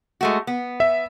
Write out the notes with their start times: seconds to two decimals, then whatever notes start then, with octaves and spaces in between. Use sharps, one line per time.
0.21 G#3 A3 F#4
0.47 B3
0.80 E5